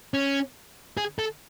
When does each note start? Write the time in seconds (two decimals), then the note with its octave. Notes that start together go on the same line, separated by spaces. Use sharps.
0.14 C#4
0.97 G#4
1.19 A4